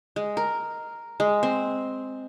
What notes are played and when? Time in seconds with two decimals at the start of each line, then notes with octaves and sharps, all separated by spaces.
0.16 G#3
0.37 A#4
1.20 G#3
1.43 C4